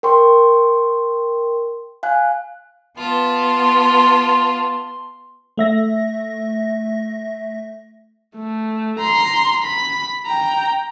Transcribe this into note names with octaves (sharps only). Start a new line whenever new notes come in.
A#4 G5 C6 C#6
F5 G#5 F#6
B3 F4 A5 C6
A3 E5 A#6
A3
A#5 C6
B5
G5 A#5